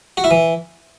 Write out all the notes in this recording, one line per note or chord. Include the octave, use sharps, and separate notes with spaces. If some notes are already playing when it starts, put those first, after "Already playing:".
F#4
E4
E3